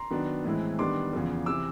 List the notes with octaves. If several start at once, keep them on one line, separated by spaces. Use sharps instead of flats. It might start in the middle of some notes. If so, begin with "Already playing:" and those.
Already playing: A#5 C6
D#3 F#3 B3 D4
A2 E3 G#3 C4 E4
D#3 G3 B3 D4 C6 D6
E2 C#3 F3
C3 E3 D6 E6